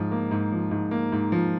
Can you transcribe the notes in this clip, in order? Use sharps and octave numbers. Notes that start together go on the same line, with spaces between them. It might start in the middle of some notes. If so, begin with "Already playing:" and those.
Already playing: G#2 F3
A#3
G#2
F3
G#2
A#3
G#2
F3